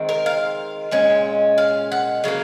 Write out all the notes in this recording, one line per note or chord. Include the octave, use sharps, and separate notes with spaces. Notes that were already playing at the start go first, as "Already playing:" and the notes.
Already playing: D#3 G#3 C4
A#4
F5
A#2 G#3 C#4
F5
F#5
C#3 F#3 A#3 F5